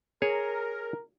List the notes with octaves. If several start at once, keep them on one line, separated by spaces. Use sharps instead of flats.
G#4 A#4 C#5